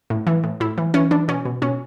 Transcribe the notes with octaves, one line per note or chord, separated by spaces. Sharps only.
A2
E3
A2
A2 E4
E3
E3 C#4
E3 D4
B2 C#4
B2
B2 C#4